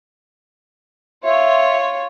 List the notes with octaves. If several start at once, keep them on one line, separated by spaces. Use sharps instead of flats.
F4 C#5 E5